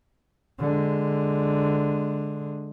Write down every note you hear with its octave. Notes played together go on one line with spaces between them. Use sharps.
D3 G#3